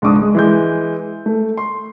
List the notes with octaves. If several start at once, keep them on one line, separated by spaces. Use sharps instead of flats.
C#2 G#2 D4 D6 D#6
G#3
E3 G#3 G6
A3
C6